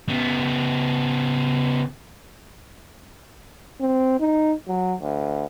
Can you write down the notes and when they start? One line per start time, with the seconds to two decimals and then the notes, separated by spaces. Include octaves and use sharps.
0.09 C#3 B3
3.81 C4
4.20 D#4
4.68 F#3
5.00 D2